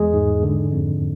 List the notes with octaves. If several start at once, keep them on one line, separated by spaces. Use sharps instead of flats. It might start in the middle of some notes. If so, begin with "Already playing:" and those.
Already playing: E2 E3 G#3 G#4
G#2
D3
F2